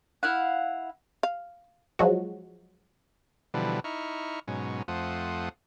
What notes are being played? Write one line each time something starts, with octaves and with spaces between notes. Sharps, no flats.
E4 F5 F#5
F5
F3 F#3 G#3 F#4
B2 D3 E3 F3 G3
D#4 E4 C#6 F6
G#2 B2 F#3 C#4
F2 A3 F4 C5 F#5 D#6